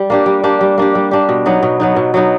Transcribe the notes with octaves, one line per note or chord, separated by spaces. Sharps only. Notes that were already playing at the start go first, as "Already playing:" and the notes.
Already playing: G3
A#3 D4 G4
G3
A#3 D4 G4
G3
A#3 D4 G4
G3
A#3 D4 G4
B2
F#3 B3 D#4
B2
F#3 B3 D#4
B2
F#3 B3 D#4